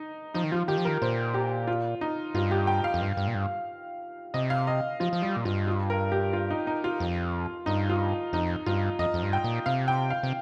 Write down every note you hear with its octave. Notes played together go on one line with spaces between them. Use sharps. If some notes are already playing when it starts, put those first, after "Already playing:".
Already playing: D#4
F3 D#4
D#3
F3 F4
D#3 G4
F3
A#4
D#3
A#2 C5
G4
F4
D#4
G2 F4
G4
G5
F5
F2
G2
G2
A#2
G2
C3 D#5
F5
D#5
F3 F4
F3
G3 F4
A#2
G2 F4
F4
A#4
G4
F4
D#4
D#4
F4
F2
G2 D#4
F4
F2 D#4
G2 F4
F2 D#5
F2
G2
G5
A#2
C3 F5
G5
F5
C3